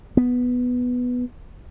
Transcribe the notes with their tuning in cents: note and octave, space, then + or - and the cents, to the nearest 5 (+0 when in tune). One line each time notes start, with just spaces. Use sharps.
B3 +0